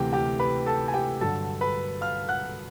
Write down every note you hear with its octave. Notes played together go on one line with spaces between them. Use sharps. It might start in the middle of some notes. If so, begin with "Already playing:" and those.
Already playing: D2 C3 E3 G4 G5
G4 G5
B4 B5
A4 A5
G#5
G4 G5
G2 D3 F#3 A4 A5
B4 B5
F5 F6
F#5 F#6